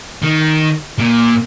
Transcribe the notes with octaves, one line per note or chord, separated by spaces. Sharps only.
D#3
A#2